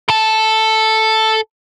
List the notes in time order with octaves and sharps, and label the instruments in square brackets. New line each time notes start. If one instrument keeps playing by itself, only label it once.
[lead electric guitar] A4 A5